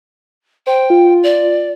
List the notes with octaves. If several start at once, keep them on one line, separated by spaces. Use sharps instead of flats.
C5 G5
F4
D5